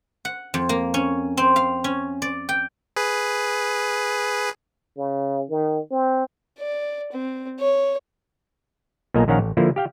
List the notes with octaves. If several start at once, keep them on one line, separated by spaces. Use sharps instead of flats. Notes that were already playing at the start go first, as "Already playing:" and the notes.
F#5
F2
A#3
C#4
C4
F5
C#4
D5
G5
G#4 B4
C#3
D#3
C4
D5
C4
C#5
B1 A#2 A#3 D#5 G#5 A#5
A#1 D#3 C#4 F5 F#5 A#5
A1
D3 F3 A#3 E4
G4 F5 G5